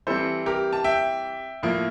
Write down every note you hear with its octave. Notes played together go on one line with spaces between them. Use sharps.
E3 G3 C4 A4 C5
G4 A#4
A5
E5 G5
A2 F3 A#3